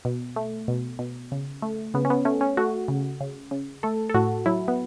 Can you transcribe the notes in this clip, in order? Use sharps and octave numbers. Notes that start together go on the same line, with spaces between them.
B2
A3
B2
B2
C#3
A3
C#3 B3
C#4
B3
A3 C#4
C#4
A3 F#4
C#3
C#3
C#3
A3 A4
A4
A2 F#4
F#3 E4
B3